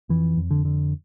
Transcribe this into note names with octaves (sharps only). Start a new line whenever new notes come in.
F2 E3
F2
D3
D3